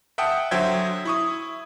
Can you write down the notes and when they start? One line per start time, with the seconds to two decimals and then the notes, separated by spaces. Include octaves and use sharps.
0.18 E5 F#5 G5 A5 D#6
0.51 D3 F#3 C5 E5 G5 G#6
1.05 E4 C#6 D#6